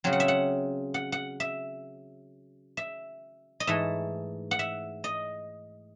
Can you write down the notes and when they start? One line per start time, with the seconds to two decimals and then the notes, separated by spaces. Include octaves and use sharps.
0.04 C#3 F#3 C4
0.13 F#5
0.20 E5
0.28 F#5
0.94 F#5
1.12 F#5
1.40 E5
2.77 E5
3.60 D#5
3.67 G#2 E3 A3 E5
4.51 F#5
4.59 E5
5.04 D#5